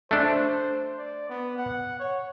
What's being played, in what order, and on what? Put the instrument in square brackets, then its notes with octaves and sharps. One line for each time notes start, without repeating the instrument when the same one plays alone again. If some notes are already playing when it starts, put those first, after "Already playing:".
[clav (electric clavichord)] A3 D4 [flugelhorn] C5
[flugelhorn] D5
B3
F#5
C#5